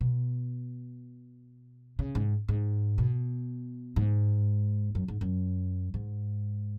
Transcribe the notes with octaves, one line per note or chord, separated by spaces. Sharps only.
B2
C#3
G#2
G#2
B2
G#2
F#2
G#2
F#2
G#2